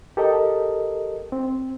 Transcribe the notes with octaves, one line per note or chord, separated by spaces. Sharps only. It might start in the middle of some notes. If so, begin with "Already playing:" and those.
G4 A4 A#4 D#5
C4